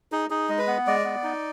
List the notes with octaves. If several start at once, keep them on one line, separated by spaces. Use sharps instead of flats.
D#4 G#4
D#4 G#4
G#3
B4
B3
G#3 D5
B3
D#4